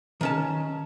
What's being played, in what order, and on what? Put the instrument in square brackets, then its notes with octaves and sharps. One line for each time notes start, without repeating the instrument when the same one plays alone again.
[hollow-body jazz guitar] D#3 C#4 A5